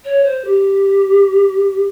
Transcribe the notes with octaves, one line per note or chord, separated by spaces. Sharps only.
C#5
C5
G4